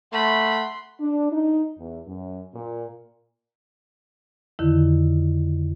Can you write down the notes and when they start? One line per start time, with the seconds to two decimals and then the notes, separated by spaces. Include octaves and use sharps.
0.13 A3 F#5 B5 C6
1.00 D4
1.32 D#4
1.78 E2
2.07 F#2
2.54 A#2
4.59 F2 D3 D#3 E4